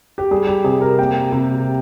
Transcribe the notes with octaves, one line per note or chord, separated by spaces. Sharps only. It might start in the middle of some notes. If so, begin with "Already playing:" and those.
G4
G3 G#4
G4
C3 G#4
A#4
A#3 G5
C3